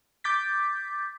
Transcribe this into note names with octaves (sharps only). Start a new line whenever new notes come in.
D6 G6 A6 B6